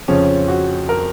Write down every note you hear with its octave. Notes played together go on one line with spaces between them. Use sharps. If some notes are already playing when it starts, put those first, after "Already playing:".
F2 C#3 F3 C#4
F#4
A#4